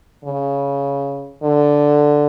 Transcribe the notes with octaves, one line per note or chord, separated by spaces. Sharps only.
C#3
D3